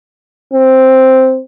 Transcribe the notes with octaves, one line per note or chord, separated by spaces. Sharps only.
C4